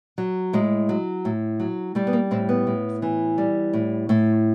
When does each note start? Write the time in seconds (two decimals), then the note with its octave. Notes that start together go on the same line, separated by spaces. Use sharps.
0.18 F#3
0.53 A2 G#3
0.89 F#3
1.25 A2
1.60 F#3
1.95 G3 A3
2.07 B3
2.13 A#3
2.31 A2 C4
2.49 B3
2.67 A2
3.02 E3
3.38 G3
3.73 A2
4.09 A2 A3